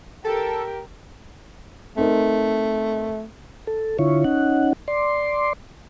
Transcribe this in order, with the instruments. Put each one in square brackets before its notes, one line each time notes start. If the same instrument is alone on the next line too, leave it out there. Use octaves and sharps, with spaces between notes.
[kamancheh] G4 A#4 [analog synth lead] A4
[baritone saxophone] A3 [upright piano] C4 D#4 A#4
[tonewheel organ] A4
D3 E4 F4 C#5
C#4 D#4 F#5
D5 C6